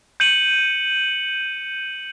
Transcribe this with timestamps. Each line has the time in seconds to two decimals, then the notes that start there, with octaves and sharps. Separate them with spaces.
0.20 G6 C#7 D#7 F#7